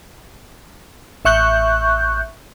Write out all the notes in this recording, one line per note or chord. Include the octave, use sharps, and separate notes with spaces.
A1 E5 C#6 F#6 G6